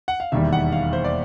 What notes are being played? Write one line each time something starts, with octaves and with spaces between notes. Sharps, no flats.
F#5
F5
E1 D#2 D#3 G3 E5
F#5
F5
C5
D5